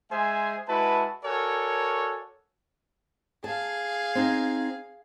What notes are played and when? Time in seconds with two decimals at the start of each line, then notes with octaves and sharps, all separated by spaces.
0.12 G#3 G#4 C5 E5 G#5
0.69 G#3 E4 F#4 B4 A5
1.24 F#4 A4 A#4 C#5 D5 G#5
3.44 G#4 F5 A5
4.15 C4 D#4